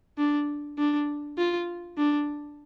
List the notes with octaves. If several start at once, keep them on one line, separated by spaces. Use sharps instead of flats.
D4
D4
F4
D4